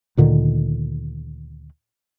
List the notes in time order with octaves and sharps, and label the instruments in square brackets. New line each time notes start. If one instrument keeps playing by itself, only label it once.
[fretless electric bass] D2 A#2 D3 D#3